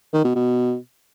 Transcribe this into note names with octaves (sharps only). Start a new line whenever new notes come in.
D#3
B2
B2